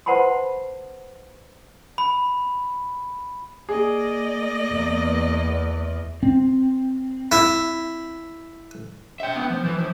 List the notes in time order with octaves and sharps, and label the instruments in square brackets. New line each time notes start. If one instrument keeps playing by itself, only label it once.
[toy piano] B4 C5 F#5 A5 B5 C6
[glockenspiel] B5
[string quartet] A#3 D5 D#5 [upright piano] G#4
[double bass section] E2
[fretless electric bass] C4
[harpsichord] E4
[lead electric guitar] E5 G5
B3
F3
E3
F3